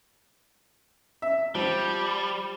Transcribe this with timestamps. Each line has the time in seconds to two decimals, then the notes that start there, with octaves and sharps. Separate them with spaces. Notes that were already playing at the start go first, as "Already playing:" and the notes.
1.22 E5
1.55 F3 G3